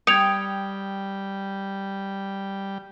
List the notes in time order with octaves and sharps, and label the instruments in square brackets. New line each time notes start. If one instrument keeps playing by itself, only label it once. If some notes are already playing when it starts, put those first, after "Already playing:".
[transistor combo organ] G3 [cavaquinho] G5 [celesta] D#6 G#6 [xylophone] C#7 F7